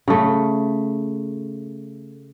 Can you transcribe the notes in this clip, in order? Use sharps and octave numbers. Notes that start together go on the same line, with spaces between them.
C#3 A3